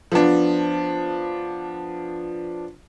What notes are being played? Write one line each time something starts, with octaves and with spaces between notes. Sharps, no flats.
F3 B3 D4